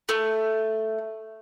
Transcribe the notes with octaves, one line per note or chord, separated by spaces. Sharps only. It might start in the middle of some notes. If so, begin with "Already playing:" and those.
A3